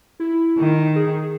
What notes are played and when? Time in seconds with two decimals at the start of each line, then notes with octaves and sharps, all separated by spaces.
0.20 E4
0.58 D#3
0.96 G#4